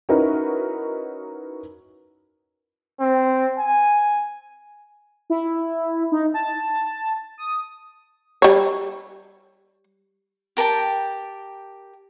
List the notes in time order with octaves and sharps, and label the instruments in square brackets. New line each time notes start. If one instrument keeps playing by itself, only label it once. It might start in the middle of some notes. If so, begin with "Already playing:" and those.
[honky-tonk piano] C#4 D#4 E4 F#4 A#4 B4
[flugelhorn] C4
G#5
[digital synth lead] E4
D#4
A5
D#6
[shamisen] G3 C#5
[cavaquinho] G4 A#4 G5 A5